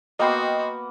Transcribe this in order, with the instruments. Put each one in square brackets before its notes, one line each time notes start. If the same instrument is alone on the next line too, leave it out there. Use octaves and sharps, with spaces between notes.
[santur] A#3 B3 [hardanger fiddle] F#4 [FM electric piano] D#5 G5 C6